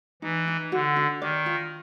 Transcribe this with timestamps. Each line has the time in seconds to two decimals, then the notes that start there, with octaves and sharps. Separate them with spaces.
0.22 E3 D#4
0.48 D#4
0.72 D3 F#4
0.96 D4
1.22 D#3 D5
1.46 F4